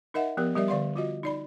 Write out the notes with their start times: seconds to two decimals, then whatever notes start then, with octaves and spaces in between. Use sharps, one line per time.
0.14 D#4 A#4 D#5 E5 F#5
0.37 F3 B3 G4 A#4
0.55 G3 G4 A#4 D5 E5
0.68 D3 D5 F5 C6
0.96 F4 F#4 D#5
1.23 D#4 D5 B5